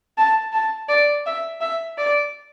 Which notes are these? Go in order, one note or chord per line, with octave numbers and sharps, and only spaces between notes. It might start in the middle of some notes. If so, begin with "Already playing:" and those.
A5
A5
D5
E5
E5
D5